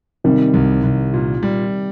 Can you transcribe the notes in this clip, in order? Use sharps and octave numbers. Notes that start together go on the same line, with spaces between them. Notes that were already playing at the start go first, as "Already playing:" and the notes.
C3 D#3 G3
C2
C2
A#2
G3